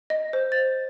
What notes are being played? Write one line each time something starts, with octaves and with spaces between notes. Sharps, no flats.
D#5
C5
A6